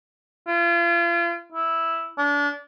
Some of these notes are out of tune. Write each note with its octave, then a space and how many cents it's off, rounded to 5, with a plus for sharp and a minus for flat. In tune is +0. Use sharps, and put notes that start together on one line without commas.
F4 -35
E4 -5
D4 -30